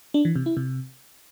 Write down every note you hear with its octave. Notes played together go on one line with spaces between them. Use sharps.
D4
E3
C3
E4
C3